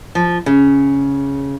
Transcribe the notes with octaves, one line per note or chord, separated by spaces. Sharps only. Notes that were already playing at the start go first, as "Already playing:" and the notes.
F3
C#3